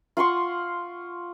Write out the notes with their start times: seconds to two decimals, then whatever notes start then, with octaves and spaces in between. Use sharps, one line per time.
0.17 F4 F#5 C6 C#6